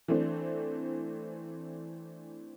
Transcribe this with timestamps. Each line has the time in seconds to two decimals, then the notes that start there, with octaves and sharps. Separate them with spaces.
0.08 E3 A3 C4 D4